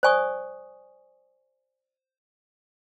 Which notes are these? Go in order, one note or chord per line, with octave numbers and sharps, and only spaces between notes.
C5 D5 G#5 C#6 D#6